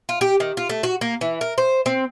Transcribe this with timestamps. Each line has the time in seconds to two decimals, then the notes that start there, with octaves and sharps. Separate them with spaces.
0.09 F4
0.21 G4
0.40 D#3
0.57 F4
0.69 A3
0.83 F#4
1.01 A#3
1.21 E3
1.41 A#4
1.58 C5
1.86 C4